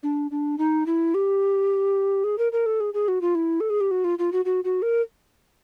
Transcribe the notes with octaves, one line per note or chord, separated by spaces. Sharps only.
D4
D4
D#4
E4
G4
G#4
A#4
A#4
A4
G#4
G#4
F#4
F4
E4
A4
G#4
G4
F#4
F4
F4
F#4
F#4
F#4
A#4